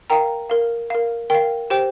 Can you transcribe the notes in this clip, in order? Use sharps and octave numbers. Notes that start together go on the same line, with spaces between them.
A#4 F5 G5 A#5
A#4 F5
A#4 F5
A#4 F5 G5
G4 C5 G5